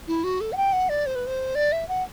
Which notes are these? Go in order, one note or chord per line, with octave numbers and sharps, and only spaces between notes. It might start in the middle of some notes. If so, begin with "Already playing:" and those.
E4
F#4
A4
F#5
G5
F#5
D5
C5
B4
C5
D5
E5
F#5